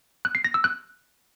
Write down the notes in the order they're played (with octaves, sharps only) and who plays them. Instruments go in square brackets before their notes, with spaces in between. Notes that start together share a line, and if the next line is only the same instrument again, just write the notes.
[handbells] F#6
C7
A#6
E6
F#6